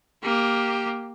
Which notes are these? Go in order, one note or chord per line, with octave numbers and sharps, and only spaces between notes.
A#3 G4